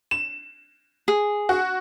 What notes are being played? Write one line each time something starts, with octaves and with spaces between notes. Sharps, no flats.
E7
G#4
F#4